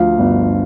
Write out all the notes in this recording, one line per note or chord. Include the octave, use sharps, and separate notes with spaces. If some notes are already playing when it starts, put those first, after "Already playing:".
Already playing: D2 F3 F5
G1